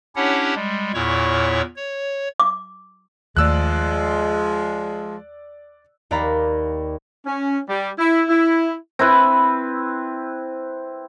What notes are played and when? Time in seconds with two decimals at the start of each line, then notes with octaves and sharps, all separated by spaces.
0.16 C#4 D4 E4 G4 C#5 F#5
0.56 G3 G#3
0.94 E2 A#2 E4 C#5 C#6
1.76 C#5
2.40 D6
3.37 D#2 F3 G#3 A3 D5 E6 F#6
6.11 D#2 D5 F5 A#5 B5
7.26 C#4
7.69 G3
7.98 E4
8.29 E4
8.99 C4 E4 B4